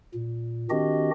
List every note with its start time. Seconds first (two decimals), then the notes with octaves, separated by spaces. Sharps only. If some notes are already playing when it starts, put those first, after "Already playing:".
0.14 A#2
0.70 D#3 C4 D4 F#4 G4 D#5